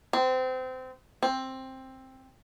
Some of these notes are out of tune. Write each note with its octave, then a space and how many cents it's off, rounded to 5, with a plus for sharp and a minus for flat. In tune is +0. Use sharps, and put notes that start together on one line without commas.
C4 -25
C4 +10